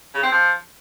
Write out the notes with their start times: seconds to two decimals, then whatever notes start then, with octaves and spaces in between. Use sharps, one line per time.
0.15 C#3
0.23 C4
0.32 F3